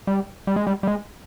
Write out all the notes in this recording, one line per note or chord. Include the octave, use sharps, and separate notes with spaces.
G3
G3
G#3
G3
G3
G#3